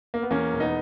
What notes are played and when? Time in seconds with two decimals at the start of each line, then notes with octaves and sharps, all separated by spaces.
0.14 A#3
0.22 B3
0.31 E2 A#3 C#4
0.53 E1
0.60 B3 D#4